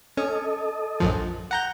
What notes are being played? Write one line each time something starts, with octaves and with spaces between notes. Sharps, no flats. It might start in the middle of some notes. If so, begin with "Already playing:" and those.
C#4 A4 D#5
A#1 F#2 F3
F#5 G5 A#5 G6